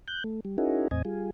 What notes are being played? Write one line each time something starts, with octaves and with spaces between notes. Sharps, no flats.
F#6 G6
A3
G3
C#4 D#4 E4 F#4 G#4 A#4
E2 A2 C4 D#5 G#5
G3 F4 G#4